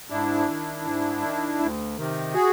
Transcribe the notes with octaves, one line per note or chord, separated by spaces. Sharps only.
G#2 D4 E4
D#3
G#2
D#3
D2
C3 D#3
F#4 G#4